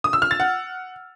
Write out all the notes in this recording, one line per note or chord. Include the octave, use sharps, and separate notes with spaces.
D#6
E6
F6
A6
F#5